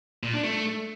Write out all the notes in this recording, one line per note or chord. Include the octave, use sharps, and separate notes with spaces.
A#2
D4
A3